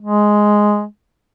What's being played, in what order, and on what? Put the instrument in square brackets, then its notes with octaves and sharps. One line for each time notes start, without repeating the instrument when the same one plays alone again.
[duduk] G#3